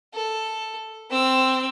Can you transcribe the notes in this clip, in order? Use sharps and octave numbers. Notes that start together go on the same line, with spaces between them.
A4
C4 E6